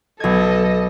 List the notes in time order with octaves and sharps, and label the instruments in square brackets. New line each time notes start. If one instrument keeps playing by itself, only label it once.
[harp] B1 G#6 [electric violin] A4 D#5